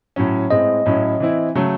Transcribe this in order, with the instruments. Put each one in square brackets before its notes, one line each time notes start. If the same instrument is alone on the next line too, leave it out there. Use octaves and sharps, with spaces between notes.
[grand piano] A2 F#3 C#4
[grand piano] A2 G#3 C4 [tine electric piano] D#5
[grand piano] A2 F#3 C#4 E4
E3 C4 E4
C#3 F#3 A3